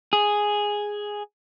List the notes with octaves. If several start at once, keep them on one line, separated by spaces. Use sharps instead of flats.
G#4